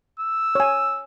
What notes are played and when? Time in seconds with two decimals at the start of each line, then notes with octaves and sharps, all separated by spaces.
0.20 E6
0.55 C#5 G#5